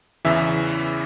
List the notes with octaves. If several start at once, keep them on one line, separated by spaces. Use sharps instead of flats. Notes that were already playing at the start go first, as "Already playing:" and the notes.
E2 C#3 E3 E5